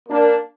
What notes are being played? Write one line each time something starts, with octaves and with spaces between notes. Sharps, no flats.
A#3 D4